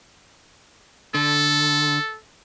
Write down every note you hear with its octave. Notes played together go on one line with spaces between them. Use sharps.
D3 A4